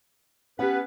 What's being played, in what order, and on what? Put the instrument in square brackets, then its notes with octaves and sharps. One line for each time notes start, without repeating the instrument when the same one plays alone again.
[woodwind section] B3 C#4 B4 [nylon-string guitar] G4 F#5